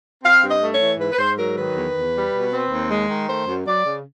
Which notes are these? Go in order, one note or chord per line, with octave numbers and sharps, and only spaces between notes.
C4 F5
G2
D#5
A3
C#5
E3
G#2 B4
B4
G#2 C5
F#3 A#4
D#3 B4
E2
E2
G3
B2
C4
D#2
G#3
D#3
A3 C5
F#2
F#3 D5
C#3